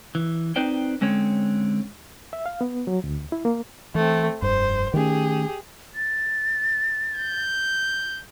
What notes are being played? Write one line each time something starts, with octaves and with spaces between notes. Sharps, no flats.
E3
C4 D#4 B4 C5 D5 G5
D3 G#3 C4 C#4 C#5
E5
F5
B3
F#3
D2
E4
A#3
E3 A3 C4
F1 G2 C5
D#3 A3 C#4 G4 G#4
A6
G6